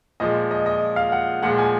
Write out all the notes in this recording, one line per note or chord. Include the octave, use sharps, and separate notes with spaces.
A#2 F3 G#3 D#5
D#5
D#5
F5
F#5
A#2 F3 G#3 F#5
G#5